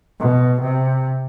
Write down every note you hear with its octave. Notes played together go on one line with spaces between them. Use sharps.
B2
C3